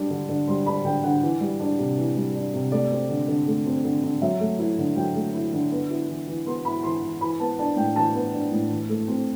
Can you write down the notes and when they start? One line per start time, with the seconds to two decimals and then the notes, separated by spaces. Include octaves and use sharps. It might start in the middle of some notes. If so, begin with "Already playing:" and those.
Already playing: G3 D4
0.10 D3
0.29 D3
0.48 G3 C6
0.66 D4 B5
0.85 D3 G5
1.04 D3 F#5
1.22 E3
1.41 G3
1.60 D4
1.79 C3
1.97 E3
2.16 G3
2.35 D4
2.54 C3
2.72 A3 D5
2.91 C4
3.09 D3
3.28 D3
3.47 A3
3.66 C4
3.84 D3
4.03 D3
4.22 F#3 E5
4.40 A3
4.59 E4
4.78 D3
4.96 F#3 G5
5.15 A3
5.34 E4
5.53 D3
5.72 B3
5.90 E4
6.08 E3
6.27 E3
6.46 B3 C6
6.65 E4 B5
6.83 E3 C6
7.03 E3
7.21 E3 B5
7.40 B3 A5
7.59 D4 A5
7.76 A2 G5
7.95 E3 A5
8.14 B3
8.33 D4
8.52 A2
8.70 E3
8.89 A3
9.08 C4